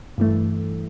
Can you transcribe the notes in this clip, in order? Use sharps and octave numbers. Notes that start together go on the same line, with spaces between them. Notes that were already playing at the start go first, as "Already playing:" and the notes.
G2 E3 A3